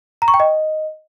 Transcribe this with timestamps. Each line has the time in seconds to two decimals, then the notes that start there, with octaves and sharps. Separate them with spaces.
0.22 A#5
0.28 C#6
0.34 G5
0.40 D#5